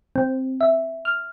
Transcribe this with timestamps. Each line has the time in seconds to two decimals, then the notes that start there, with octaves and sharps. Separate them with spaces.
0.16 C4
0.61 E5
1.05 F6